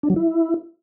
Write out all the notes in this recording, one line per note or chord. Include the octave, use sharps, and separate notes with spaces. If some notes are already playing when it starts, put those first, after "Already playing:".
D4
F#3
E4